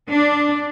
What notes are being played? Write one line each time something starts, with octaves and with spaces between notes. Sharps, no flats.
D4